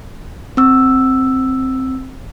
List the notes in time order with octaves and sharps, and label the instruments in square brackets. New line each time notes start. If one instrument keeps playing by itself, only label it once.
[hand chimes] C4 E6